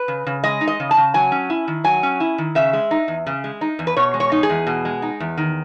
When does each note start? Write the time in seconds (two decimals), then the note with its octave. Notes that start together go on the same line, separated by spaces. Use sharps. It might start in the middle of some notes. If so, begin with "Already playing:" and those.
Already playing: B4
0.08 C#3
0.27 C#3
0.44 G#3 D#5
0.61 D#4
0.67 D#5
0.80 C#3
0.91 A5
0.97 C#3
1.14 F#3 G#5
1.32 C#4
1.50 E4
1.68 D#3
1.84 F#3 G#5
2.03 C#4
2.20 E4
2.38 D#3
2.55 C#3 E5
2.73 G#3
2.91 D#4
3.08 E2
3.27 C#3
3.44 G#3
3.61 D#4
3.79 E2
3.87 B4
3.96 B2 C#5
4.14 G#3
4.20 C#5
4.32 D#4
4.43 G#4
4.50 E2
4.67 B2
4.85 G#3
5.02 D#4
5.20 E2
5.38 D#3